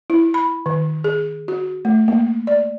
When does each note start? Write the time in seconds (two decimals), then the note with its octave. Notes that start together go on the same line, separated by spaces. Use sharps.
0.10 E4
0.34 B5
0.66 D#3
1.04 G#4
1.48 F#4
1.85 A3
2.08 A#3
2.47 D5